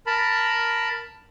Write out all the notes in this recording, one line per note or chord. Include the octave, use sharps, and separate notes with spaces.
A#4 A5 B5